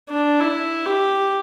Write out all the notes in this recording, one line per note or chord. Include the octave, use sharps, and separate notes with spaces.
D4
E4
G4